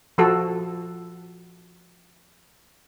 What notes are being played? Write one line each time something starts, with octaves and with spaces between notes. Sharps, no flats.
F3 F#4 A4